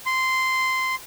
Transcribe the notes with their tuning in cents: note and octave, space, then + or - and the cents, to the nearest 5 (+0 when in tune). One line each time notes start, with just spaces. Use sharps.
C6 -10